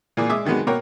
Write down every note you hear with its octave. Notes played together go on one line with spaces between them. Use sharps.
A#2 E3 A#3 G#4
G#3 E5 D6 D#6
C3 D#3 F#3 G#3 B3
B2 A#3 A#4 C#5 F#5 G5